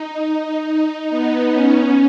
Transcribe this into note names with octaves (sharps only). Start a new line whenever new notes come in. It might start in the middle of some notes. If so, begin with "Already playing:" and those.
Already playing: D#4
D#4
B3
C#4